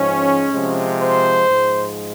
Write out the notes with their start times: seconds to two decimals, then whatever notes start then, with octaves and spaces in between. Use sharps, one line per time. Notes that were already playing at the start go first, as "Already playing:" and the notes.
Already playing: G#2 F3 G#3 C#4
0.52 C3 F3 G#3
1.00 C5
1.48 G#2 F3 G#3